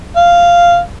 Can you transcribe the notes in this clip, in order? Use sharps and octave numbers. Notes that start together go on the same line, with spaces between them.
F5